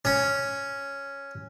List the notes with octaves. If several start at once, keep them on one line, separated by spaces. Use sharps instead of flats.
C#4